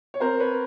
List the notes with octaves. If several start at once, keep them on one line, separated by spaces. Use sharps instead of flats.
C#5
C4 A#4 C5
B4 C#5